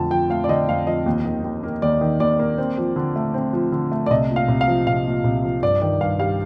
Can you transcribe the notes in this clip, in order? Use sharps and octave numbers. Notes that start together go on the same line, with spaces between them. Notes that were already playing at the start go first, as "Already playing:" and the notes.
Already playing: F2 D3 A3 A5
F3 G5
A3 F5
D5
D3 D#5
F2 F5
F3 D#5
D#2
D#3
D#2
A#3
D#2 D5
D#3
D#2 D5
A#3
C4
F3
D3
A3
C4
F3
D3
A3
D5
C2 D#5
A#2
F5
C2
F5
F3
C2 F5
A#2
C2
F3
G2 D5
D#3 D5
G2 F5
G3 F5